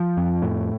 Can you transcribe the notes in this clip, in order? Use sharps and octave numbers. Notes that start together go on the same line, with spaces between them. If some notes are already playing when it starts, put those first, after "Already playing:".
Already playing: F3
F2
A2